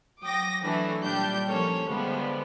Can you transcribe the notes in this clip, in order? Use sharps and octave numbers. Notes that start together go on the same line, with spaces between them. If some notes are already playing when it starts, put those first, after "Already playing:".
F#3 G5 D6 D#6 A#6
E3 F#3 A3 D4
A#2 G3 D4 G4 G6
F3 A#3 C#4 A4 C#5
D3 F3 G3 G#3 B3